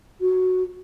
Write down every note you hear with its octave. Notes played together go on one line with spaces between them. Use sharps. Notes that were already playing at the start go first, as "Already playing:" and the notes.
F#4